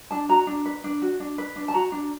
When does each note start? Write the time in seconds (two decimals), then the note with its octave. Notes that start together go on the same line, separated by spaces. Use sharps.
0.11 D4 A5
0.29 F#4 A#5
0.47 D4
0.66 B4
0.84 D4
1.02 F#4
1.20 D4
1.38 B4
1.56 D4
1.68 A5
1.74 F#4 A#5
1.92 D4